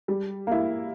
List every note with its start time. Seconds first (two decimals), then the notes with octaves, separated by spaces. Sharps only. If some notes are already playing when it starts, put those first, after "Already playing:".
0.08 G3
0.47 A#3 E4